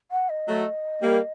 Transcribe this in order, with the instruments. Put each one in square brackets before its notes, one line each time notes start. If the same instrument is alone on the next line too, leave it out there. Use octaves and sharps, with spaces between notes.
[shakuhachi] F#5
D#5
[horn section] F#3 A3
G3 A#3